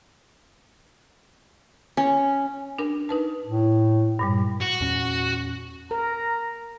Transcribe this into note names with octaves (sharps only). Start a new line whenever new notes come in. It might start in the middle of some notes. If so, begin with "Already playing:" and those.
C#4
D4 A#4
D#4 B4 A5
A2
G2 A#2 G3
F#4
E2 A#2 C#4
A#4 A#5